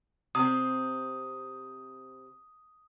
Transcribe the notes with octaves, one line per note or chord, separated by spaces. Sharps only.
C3 C4 D#6